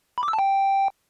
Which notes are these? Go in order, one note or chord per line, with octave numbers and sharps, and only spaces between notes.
B5
D6
E6
A5
G5